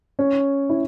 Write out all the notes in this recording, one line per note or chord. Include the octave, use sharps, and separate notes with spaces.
C#4
E4